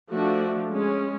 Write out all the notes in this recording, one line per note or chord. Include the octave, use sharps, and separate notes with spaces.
F3 A3 D4 F#4
G#3 C#4